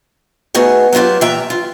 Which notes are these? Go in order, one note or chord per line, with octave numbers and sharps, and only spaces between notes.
A3 B3 D#4 F#4 G#4
F#3 B3 E4 F4 G4
A#2 E3 E5 G5 A#5
F4